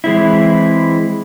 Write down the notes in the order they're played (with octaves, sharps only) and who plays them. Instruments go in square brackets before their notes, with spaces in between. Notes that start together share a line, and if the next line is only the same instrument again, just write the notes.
[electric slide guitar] E3 G#3 C4 E4